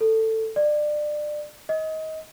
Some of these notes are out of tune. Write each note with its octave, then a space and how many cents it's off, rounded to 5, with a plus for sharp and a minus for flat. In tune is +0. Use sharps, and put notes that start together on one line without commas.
A4 +15
D5 +25
D#5 +25